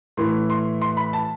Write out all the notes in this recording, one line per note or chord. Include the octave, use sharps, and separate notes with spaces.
A2 E3 C6
C6
C6
B5
A5